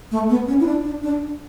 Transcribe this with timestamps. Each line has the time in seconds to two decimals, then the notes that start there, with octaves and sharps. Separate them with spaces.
0.11 A3
0.30 B3
0.48 C#4
0.60 E4
0.66 D4
0.84 D4
1.03 D4